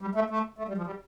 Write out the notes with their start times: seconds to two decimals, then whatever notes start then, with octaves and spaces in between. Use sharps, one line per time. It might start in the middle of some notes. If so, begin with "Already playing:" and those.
0.01 G3
0.15 A3
0.30 A3
0.58 A3
0.68 G3
0.77 F3
0.86 G3